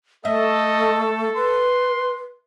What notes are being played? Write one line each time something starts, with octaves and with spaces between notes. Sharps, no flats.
A3 A4 D#5 E5
B4 C6